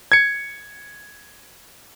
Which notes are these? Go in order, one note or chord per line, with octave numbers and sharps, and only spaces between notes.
G#6 C#7